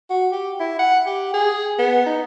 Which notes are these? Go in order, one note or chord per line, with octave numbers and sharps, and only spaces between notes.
F#4
G4
E4
F#5
G4
G#4
B3
D#4